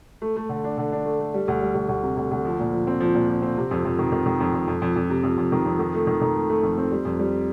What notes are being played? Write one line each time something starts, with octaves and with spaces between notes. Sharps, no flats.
A3
A3
D3
D4
D3
D4
A3
A3
G3
D2
G3
D2
D2
C3
D2
D2
F3
A#2
F3
C4
F3
A#2
F3
C4
C3
F2
F2
D#3
D#3
D#3
F2
F2
F2
F2
F2
C3
F2
F2
D#3
F2
D#3
A3
D#3
D#3
A3
A3
F2
C4
G3
F2
G3